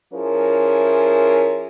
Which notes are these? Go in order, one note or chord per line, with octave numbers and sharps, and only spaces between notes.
F3 C#4 E4 G#4 A#4